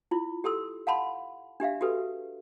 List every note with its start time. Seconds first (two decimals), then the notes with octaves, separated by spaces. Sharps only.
0.11 E4 F4
0.44 G4 A4 C6 E6
0.87 F5 F#5 A5 B5 C6
1.60 D4 G4 E5 F5
1.81 F#4 G4 A4 B4